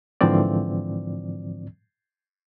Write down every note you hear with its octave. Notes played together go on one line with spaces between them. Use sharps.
G#2 D3 E3 F3 C4 D5